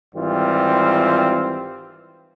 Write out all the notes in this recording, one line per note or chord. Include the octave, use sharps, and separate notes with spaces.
G#1 E3 G3 C4 F4